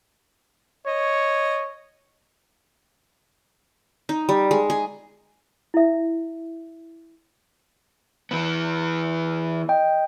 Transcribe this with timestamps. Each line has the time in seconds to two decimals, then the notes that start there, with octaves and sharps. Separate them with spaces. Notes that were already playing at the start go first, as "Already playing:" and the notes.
0.86 C#5 D#5
4.09 D#4
4.29 G3
4.51 G#3
4.70 G#4
5.74 E4 E5
8.31 E3 B3
9.69 D#5 G5